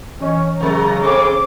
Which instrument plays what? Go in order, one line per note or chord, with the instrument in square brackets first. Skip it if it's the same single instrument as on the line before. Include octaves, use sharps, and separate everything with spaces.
[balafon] E3 D#5 [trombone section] C#4
[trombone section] C#3 [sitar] F#3 G#3 [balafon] C#4 A#4 C5 [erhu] A#5
[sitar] G#3 C4 A4 [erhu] D6